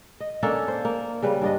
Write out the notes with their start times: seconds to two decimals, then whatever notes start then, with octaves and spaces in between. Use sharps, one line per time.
0.20 D#5
0.43 A#3 C#4 D4 A4
0.68 C5
0.85 A#3
1.23 C#3 G3 B4
1.42 G2 D4 D#5